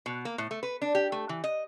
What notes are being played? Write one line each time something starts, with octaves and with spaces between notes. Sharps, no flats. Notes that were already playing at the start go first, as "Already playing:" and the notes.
B2
A#3
A2
A3
B4
D4
G4
A3
E3
D#5